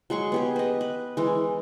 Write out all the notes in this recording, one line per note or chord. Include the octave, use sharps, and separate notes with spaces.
F#3 G#3 C6 C#6
B3 G4 G#4
B4 D#5
B4
E3 G#3